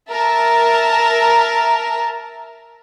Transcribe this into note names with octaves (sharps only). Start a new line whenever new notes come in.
A#4 E5 A5